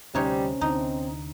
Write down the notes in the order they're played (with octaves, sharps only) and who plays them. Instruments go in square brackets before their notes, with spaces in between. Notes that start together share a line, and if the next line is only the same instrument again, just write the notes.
[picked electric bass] D2 [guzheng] C3 D#4 C#5 [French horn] G3 [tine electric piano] C#4
[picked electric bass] D2 D3 D4 [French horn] C4 [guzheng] D#4